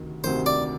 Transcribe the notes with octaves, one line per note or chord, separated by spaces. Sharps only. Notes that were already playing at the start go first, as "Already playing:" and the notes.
Already playing: D2 C3 D#3
D2 C3 D#3 C5
D5